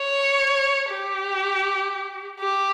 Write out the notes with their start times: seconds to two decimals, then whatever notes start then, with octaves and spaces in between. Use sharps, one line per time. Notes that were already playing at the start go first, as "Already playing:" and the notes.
Already playing: C#5
0.92 G4
2.41 G4